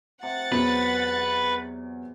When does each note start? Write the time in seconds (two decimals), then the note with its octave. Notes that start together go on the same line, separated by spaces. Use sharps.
0.23 C3 F#5 A6
0.52 E2 F#3 B4